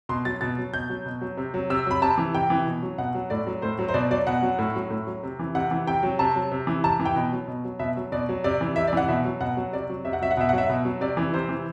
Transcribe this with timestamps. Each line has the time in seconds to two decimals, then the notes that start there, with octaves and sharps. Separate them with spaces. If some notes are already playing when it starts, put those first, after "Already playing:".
0.09 B2 C6
0.25 F#3 A6
0.41 B2 A6
0.58 F#3
0.73 B2 G6
0.89 F#3
1.06 B2
1.21 F#3
1.37 C3
1.54 F#3
1.70 C3 E6
1.86 F#3 B5
2.02 C3 A5
2.18 E3
2.34 C3 G5
2.50 E3
2.66 B2
2.82 F#3
2.98 B2 F#5
3.14 F#3
3.30 A2 D5
3.47 F#3
3.62 A2 C5
3.79 F#3
3.88 C5
3.94 B2 D5
4.11 F#3 D5
4.27 B2 F#5
4.42 F#3
4.59 A2
4.76 F#3
4.90 A2
5.07 F#3
5.23 C3
5.39 E3
5.55 C3 F#5
5.71 E3
5.87 C3 G5
6.03 F#3
6.19 C3 A5
6.36 F#3
6.52 C3
6.67 E3
6.84 C3 A5
6.99 E3
7.05 G5
7.16 B2
7.32 F#3
7.48 B2
7.64 F#3
7.79 B2 E5
7.97 F#3
8.12 B2 D5
8.29 F#3
8.44 C3 D5
8.61 E3
8.76 C3 E5
8.87 D5
8.93 E3 F#5
9.08 B2 E5
9.25 F#3
9.41 B2 F#5
9.57 F#3
9.73 C3 D5
9.89 F#3
10.05 C3 E5
10.13 F#5
10.22 F#3 E5
10.31 F#5
10.37 B2 E5
10.49 F#5
10.53 F#3
10.58 E5
10.69 B2
10.85 F#3
11.01 C3 D5
11.17 E3
11.33 C3 C5
11.49 E3